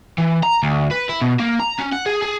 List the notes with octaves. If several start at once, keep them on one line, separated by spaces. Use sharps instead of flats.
E3
A#5
D2
B4
E4
B2
A#3
A#5
C#4
F#5
G#4
G#4